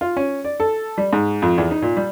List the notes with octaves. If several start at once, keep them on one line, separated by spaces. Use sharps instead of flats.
F4
C#4
D5
A4
G3
G#2
F2
E2
D#4
A#2
G3